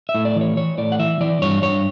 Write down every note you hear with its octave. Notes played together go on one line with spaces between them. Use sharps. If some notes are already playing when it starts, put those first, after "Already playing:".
E5
A2
D5
E3
C#5
E3 C#5
A2 D5
F#5
E3 E5
E3 D5
G2 C#5
G2 C#5